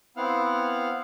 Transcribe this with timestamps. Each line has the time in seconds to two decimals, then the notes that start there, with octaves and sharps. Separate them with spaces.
0.17 B3 C4 E4 F5 F#5 F6